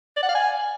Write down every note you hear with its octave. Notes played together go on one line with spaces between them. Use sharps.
D5
F#5
F5
G#5